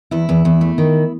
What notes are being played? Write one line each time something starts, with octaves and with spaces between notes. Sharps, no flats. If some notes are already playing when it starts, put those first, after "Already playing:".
E2 E4
E2
E2
A3
D#3